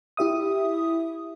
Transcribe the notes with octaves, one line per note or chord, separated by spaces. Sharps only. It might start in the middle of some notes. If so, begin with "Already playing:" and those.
E4 G4 E5 D#6